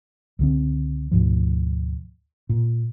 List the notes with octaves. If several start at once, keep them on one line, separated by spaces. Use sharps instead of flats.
C#2 D3 C4
D2 G#2 B2 F3
A#2